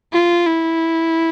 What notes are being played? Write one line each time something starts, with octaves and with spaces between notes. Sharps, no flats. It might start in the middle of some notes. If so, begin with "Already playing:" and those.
F4
E4